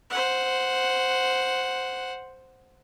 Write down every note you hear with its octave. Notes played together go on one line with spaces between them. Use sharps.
C5 F#5